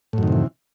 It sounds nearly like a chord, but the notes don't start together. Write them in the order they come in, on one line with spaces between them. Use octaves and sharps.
A2 F#2 D#3 C3 E3